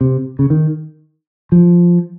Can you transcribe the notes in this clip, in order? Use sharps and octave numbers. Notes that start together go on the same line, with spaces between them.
C3
C#3
D#3
F3